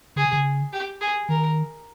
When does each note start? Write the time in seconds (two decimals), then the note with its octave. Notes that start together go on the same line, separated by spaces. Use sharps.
0.16 C#3 G#4
0.25 C3
0.33 C#3
0.73 G4
1.01 G#4
1.29 D#3 A#4